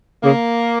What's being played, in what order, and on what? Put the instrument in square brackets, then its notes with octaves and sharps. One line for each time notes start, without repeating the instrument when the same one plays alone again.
[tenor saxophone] C#3 [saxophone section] A#3